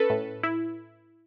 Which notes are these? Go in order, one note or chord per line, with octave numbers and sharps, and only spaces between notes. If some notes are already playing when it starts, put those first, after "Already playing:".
Already playing: C#4 A4 B4
A2
E4